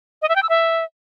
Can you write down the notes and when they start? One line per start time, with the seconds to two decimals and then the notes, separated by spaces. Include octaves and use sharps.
0.22 D#5
0.29 E5
0.36 G5
0.43 E6
0.49 E5